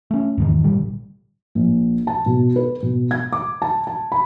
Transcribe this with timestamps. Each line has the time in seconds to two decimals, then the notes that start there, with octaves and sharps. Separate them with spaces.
0.11 A3 C#4
0.38 E2 G#2 D#3
0.64 A1 A#2 D3 G3
1.55 A#1
2.07 A5
2.26 B2
2.56 B4
2.82 B2
3.11 G#6
3.33 D6
3.62 A5
3.87 A5
4.12 B5